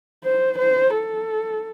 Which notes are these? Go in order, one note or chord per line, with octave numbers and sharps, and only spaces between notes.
C5
C5
A4